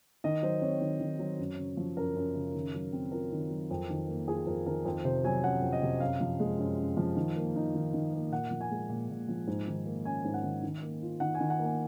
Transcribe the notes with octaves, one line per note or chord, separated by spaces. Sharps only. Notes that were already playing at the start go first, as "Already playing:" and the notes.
D#3 D#5
F#3 C5
C4 C#5
D#3
D#3
F#3
F#2
C#3
F3
F#2 A#4
F#2
C#3
D#3
F#3
C4
F4 A#4
D#3
F#3
F2
D#3
A#3
F4 G#4
F2 A#4
D#3 A#4
F2 C5
C3 C5
F#3 G#5
C#4 F#5
F2
D#5
C3
F#2 F5
F3
G#3
F#2
F#2
F3
D#3
A#3
D#4
D#3
D#3
A#3
A#2 F#5
F3
G#5
G#3
A#2
A#2
F3
G#2
D#3
A#3
C#4 G#5
G#2
F#5
D#3
D#3
A#3
F4
D#3 F#5
G#5
D#3
F#5
A#3
G#5